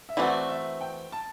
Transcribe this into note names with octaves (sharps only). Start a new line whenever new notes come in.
E5
E3 A3 C4 F#4 D5
E5
G5
A5